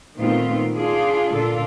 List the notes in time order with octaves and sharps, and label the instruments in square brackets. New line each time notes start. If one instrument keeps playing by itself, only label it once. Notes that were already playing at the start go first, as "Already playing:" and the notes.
[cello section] A#2 D#3 A3 B3 C4 F4
D4 F4 G#4
A#2 D3 D4 F4 A4